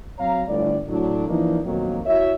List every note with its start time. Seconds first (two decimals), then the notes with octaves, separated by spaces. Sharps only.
0.19 F#3 C4 C#5 F5 A#5
0.48 G1 A2 D5
0.88 A2 F#3 D4
1.28 E3 F3 A#3 D4 D#4
1.64 F2 B2 D#3 F#3 A#3
2.05 E4 F#4 C#5 E5